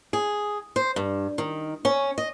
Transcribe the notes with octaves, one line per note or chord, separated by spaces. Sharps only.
G#4
C5
G2
D#3
C#4
D#5